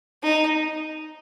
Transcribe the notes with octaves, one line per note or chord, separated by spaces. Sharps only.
D#4